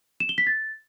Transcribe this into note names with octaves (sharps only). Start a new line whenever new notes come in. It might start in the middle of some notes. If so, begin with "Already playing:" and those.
E7
G7
B6
A6